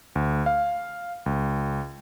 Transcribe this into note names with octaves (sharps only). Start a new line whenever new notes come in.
D2
F5
C#2